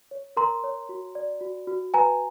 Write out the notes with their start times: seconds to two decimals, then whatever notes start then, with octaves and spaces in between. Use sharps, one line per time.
0.11 C#5
0.37 A#4 A#5 C6
0.64 C#5
0.89 F#4
1.15 D5
1.41 F#4
1.67 F#4
1.94 B4 G#5 A#5